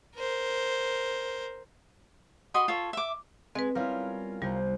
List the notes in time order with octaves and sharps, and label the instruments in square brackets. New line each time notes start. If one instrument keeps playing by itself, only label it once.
[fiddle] A#4 C5
[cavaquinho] F#4 D#5 B5 C6
F4 A4 C#5
E5 D6
[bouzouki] G#3 [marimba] C4 B4
[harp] G3 B3 E4 [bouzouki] C#4 F4 A#4
[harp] C2 C5 A#5 [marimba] G3